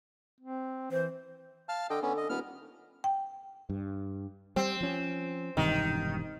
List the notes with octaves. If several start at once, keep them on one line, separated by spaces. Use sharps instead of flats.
C4
E3 C5
F5 A5 F6
D3 D#5 G5
D3 B3 C#4
D#5
D#1 B3 F6
G5
G2
G3 C4
F3 C#4
E1 G2 C3 D#3